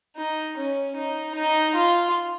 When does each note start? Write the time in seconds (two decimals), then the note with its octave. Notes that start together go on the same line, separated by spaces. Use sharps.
0.17 D#4
0.57 C#4
0.96 D#4
1.35 D#4
1.75 F4